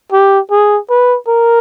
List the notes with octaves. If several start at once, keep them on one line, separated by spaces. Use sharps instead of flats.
G4
G#4
B4
A#4